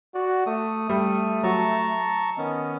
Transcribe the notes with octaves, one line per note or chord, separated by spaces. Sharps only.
F#4 D5
A3 D#6
G3 A3
F#3 A5 A#5 C#6
D#3 B3 C#4 D#5